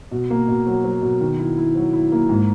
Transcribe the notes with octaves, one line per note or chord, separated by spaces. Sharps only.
B2
A#3
B2
F#3
F#3
B2
D#3
E4
E4
F#3
E4
A#3
G#2